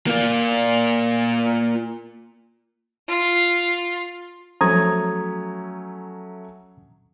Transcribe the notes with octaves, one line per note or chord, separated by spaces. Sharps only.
A#3 F4
F4
F3 F#3 A3 C#4 A#5 D#6 G#6